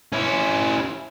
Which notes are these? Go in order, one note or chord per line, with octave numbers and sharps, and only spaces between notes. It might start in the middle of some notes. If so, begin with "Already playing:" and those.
C#4 E4